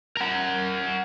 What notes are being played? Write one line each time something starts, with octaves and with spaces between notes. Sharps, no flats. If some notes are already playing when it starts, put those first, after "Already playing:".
A#4 F#5